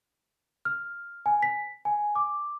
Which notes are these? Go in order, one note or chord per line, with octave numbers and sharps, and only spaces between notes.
F6
G#5
B6
G#5
D6